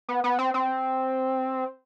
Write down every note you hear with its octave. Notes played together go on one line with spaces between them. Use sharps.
B3
B3
C4
C4